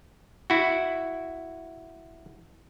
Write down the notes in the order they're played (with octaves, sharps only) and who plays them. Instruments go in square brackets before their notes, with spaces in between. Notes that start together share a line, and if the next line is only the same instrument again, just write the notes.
[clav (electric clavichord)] E4 F#4